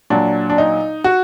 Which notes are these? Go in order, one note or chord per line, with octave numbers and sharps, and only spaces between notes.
A#2 F#3 D4
D4
D#4
F#4